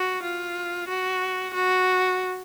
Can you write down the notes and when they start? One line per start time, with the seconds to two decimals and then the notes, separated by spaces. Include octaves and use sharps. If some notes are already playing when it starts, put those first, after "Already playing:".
Already playing: F#4
0.23 F4
0.88 F#4
1.54 F#4